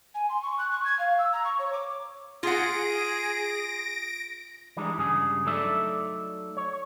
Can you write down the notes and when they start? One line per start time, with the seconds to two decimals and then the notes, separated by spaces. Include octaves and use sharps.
0.14 G#5
0.29 C6
0.42 C#6
0.58 F#6
0.70 C#6
0.84 G#6
0.99 F5
1.18 E6
1.32 A#5
1.44 C#6
1.59 C#5
1.73 D6
2.43 F4 G#4 F#5 A#6 D7
4.77 E3 G3 G#3 D4 D#4
4.98 G2 C#3 G#4
5.45 F#3 A3 D#4 A4 D5 E5
6.57 C#5